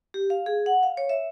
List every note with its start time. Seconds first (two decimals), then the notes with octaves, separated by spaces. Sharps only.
0.14 G4
0.30 F5
0.46 G#4
0.66 F#5
0.83 F5
0.97 C#5
1.09 E5